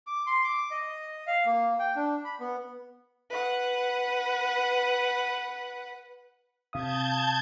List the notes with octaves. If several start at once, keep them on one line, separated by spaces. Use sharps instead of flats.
D6
C6
D6
D#5
F5
A#3
G5
D4
B5
B3
B4 F#5
C3 F5 A5 D#6 G6 G#6